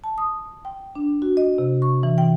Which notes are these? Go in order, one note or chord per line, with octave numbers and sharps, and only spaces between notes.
A5
D#6
G5
D4
F#4
D#5
C3
C#6
E3
G5